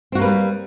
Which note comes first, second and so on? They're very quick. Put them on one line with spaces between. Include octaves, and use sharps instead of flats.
C4 F#4 A#3 B4 G3